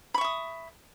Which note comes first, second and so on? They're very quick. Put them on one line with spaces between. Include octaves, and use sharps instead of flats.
B5 C#6 E5 D#6